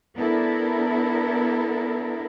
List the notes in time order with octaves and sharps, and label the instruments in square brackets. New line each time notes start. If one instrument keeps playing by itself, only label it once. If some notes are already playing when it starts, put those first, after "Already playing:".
[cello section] B3 D4 E4 A4 A#4